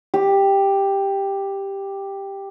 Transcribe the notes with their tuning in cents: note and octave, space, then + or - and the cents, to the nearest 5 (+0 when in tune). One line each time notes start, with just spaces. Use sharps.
G4 +5